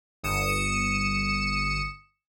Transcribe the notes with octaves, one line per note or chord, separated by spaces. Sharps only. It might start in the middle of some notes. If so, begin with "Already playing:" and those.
G1 D#6 C#7 E7